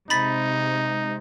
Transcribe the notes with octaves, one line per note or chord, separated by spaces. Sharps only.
C3 G#3 D#4 B5 A6 B6